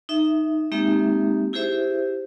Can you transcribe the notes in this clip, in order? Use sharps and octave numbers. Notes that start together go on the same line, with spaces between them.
D#4 E5
G#3 A#3 C4 D#4 G4 E5
E4 G4 G#4 C5 E5